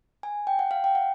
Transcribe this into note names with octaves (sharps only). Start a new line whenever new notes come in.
G#5
G5
F#5
F5
G5
F#5